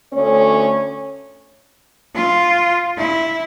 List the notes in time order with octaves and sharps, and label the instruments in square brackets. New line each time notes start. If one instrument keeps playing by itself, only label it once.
[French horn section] D2 A3 C#4 C#5
[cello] F4
E4